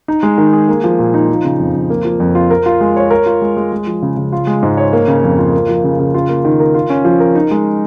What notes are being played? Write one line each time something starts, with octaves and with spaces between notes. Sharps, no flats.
D#4
G#3
D#3
G#4
A#3
F3
A#2
D#4
F3
C#3
F2
F2
A#3
F3
F2
F4
A#4
F4
G#3
C#5
A#4
F4
G#3
G#3
G#3
F3
C#3
C#3
F4
G#3
G#2
C#5
A#3
C#3
F2
F4
A#3
F3
C#3
C#3
F4
A#3
D#3
A#4
F4
C#4
F3
A#4
D#4
G#3